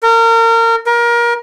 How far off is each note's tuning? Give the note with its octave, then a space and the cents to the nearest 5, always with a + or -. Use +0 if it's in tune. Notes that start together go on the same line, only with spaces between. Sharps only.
A#4 -30
A#4 +25